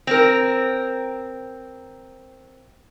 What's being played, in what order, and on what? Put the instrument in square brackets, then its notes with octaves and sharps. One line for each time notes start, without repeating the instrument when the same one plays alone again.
[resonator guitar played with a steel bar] C4 A#4